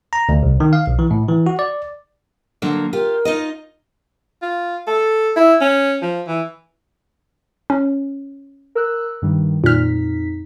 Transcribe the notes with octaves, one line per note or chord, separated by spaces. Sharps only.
A#5
D2
C2
D#3
F5
B1
E3
A2
E3
F#4
D5
D3 F#3 A#3
F4 G4 A#4
D#4 F4 D#5
F4
A4
E4
C#4
F3
E3
C#4
A#4 E6 F#6
G2 D#3 G3
F2 A#2 D#4 F6 B6